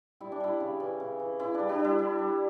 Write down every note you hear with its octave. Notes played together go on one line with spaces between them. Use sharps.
G3 E4
D4
G3 E4
C#3
E3
C#3
E3
C#3 E4
D4
G3
D4
G3
E4
G3 E4
G3